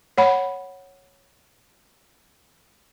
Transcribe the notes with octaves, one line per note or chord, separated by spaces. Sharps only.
C#5 F#5 B5